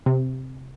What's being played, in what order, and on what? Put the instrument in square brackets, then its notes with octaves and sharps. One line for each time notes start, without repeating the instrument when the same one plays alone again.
[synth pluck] C3